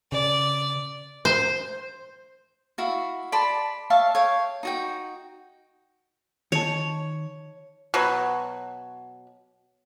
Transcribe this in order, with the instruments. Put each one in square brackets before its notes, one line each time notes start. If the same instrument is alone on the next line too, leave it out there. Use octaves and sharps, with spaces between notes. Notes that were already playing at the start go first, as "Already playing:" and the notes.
[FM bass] C#3 [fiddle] D5
[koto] C5
[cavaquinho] E4 F#4 F5
D5 A5 B5 C6
C#5 E5 F5 A5
C#5 F5 G5
D#4 F#4 G5
[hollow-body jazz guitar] D#3 A5 [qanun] C#5
[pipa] B2 F#3